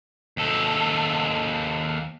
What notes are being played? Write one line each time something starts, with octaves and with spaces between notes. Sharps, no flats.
D#2 A4